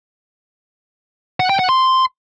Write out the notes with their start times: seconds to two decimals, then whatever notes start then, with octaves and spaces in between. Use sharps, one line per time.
1.40 F#5
1.50 G5
1.59 F#5
1.69 C6